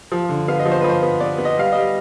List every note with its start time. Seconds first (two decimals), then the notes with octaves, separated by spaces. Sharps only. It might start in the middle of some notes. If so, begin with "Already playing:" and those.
0.12 F3
0.29 D3
0.48 B3 F5
0.59 D#5
0.65 F3
0.72 C5
0.81 F3 B4
0.89 C5
1.02 B3
1.20 B3 D5
1.38 B3
1.45 D#5
1.57 G3 F5
1.72 G3 D#5